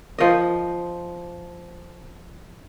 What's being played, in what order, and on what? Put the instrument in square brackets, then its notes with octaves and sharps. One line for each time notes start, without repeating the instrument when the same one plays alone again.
[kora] F3 D#5